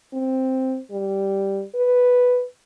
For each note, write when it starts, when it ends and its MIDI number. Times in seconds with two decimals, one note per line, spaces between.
0.13 0.79 60
0.91 1.62 55
1.75 2.44 71